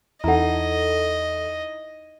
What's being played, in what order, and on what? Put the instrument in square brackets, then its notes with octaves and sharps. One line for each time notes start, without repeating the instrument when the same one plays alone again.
[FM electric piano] E2 A4 [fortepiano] D#4 E4 [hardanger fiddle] D#5 [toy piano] F#5 A#5